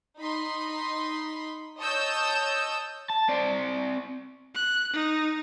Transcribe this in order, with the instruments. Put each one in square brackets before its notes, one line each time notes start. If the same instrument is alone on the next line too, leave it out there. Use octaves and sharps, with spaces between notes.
[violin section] D#4 B5 C6
C#5 D#5 A5 D#6 E6 G6
[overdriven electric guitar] A5
C4 D5
[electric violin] F#6
D#4